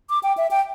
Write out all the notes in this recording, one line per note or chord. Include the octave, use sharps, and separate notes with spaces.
D6
G5
E5
G5